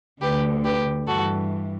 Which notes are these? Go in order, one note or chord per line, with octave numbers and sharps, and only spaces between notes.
D2 D3 G4 B4
G4 B4
G2 E3 F#4 A4